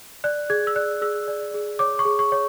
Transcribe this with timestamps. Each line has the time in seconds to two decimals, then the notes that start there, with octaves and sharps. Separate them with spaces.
0.24 D5 F#6
0.50 G#4 G#6
0.67 E6
0.76 D5 F#6
1.02 G#4 E6
1.28 D5
1.54 G#4
1.79 C#5 D6
1.99 C#6
2.05 G#4
2.19 C#6
2.32 C#5